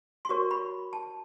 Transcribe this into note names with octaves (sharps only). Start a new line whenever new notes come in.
C6
F#4 A#4 C#5 C#6
B5
A5